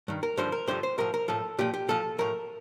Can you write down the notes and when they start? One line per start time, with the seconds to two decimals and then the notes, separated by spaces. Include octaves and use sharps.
0.08 G2 D#3
0.23 A#4
0.37 G2 D3 F3 C5
0.52 A#4
0.67 G2 D3 F3 C5
0.83 C5
0.98 A2 F3 A#4
1.14 A#4
1.28 A2 F3 A4
1.59 A#2 F3 G4
1.74 G4
1.88 A#2 F3 A4
2.18 A2 F3 A#4